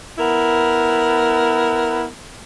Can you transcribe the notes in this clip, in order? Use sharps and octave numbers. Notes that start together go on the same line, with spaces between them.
B3 E4 A#4